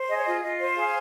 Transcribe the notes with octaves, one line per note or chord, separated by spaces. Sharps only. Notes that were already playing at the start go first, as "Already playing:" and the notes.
Already playing: C5
G#4 D#5
C#5
F4 D#5
F4 D#5
C5
G#4 F5